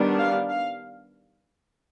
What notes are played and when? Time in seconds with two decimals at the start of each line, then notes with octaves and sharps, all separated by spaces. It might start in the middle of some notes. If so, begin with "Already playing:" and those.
Already playing: D#3 G3 B3 D4
0.18 F5
0.49 F5